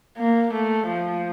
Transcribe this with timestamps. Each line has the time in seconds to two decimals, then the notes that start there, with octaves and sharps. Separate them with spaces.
0.18 A#3
0.53 A3
0.87 F3